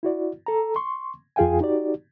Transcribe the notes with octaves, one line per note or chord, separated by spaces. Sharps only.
E4 F#4 D5
A4 A#5
C6 C#6
F2 F4 G#4 F5 G5 G#5
D#4 F#4 G4 D5